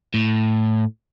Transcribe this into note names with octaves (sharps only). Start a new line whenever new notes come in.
A2